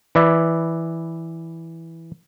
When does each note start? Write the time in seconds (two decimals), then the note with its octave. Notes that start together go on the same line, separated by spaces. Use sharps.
0.15 E3 B4 D5 E5